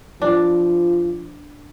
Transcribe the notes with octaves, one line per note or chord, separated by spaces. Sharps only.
F3 D4